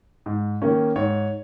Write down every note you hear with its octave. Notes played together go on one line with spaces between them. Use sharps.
G#2
D#3 A#3 C#4
G#2 C#5